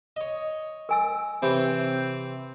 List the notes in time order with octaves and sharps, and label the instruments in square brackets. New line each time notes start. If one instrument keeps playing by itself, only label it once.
[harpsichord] C#5 D#5
[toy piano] A#4 G#5 E6
[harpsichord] C3 E3 C#5 [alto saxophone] C4